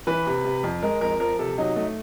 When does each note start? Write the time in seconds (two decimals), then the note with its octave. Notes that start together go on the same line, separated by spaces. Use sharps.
0.07 E3 B4
0.26 C3
0.45 C3
0.64 F2
0.82 G#3 A#4
1.01 F2 A#4
1.20 F3 A#4
1.39 C3 A4
1.58 F#3 D#4
1.76 A3